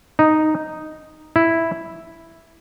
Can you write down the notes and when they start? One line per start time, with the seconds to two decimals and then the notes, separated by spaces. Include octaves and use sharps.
0.19 D#4
1.36 E4